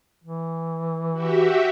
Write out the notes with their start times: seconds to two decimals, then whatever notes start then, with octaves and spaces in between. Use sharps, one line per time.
0.24 E3
1.12 F#4 G4 E5